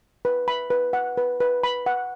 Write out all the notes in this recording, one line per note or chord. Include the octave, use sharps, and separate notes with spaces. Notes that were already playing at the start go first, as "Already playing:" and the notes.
B4
B5
B4
F#5
B4
B4
B5
F#5